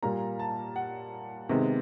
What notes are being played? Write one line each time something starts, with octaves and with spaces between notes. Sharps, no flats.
A#2 G3 A#3 A#5
A5
F#5
C3 D#3 G#3 B3